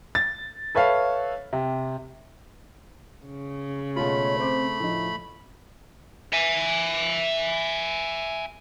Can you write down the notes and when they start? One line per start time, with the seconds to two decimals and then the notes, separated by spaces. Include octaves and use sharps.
0.15 A6
0.75 A4 B4 C#5 E5 F5
1.53 C3
3.26 C#3
3.96 B2 G#3 A3 F4 C#5 B5
4.39 C4 C5 C6 D6
4.80 A2 F3 D#4
6.33 E5 G#5